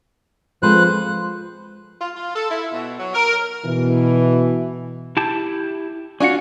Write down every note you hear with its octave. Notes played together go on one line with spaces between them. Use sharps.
F3 G#3 C4 A4 B4 C5 F#6
F4
F4
A4
E4
B2
F#3
A#4
B2 E3
E4 G4 A5
C#4 D4 F4 F#4 F#5